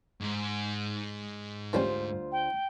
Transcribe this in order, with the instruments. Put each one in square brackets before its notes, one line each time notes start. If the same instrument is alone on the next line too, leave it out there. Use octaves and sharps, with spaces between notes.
[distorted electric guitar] G#2
[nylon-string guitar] D2 F4 C5 [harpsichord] E3 G3 C#4
[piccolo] G5